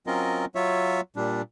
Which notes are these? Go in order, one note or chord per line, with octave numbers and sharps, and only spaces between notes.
F#3 C4 C#4 F4 A#4 D#5
F#3 F4 C#5 E5
A#2 G3 D4